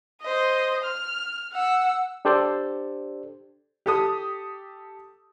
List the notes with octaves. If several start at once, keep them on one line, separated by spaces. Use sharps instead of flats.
C5 D#5
F6
F#5 E6
D4 G4 A4 C5 D5
G4 A4 D#6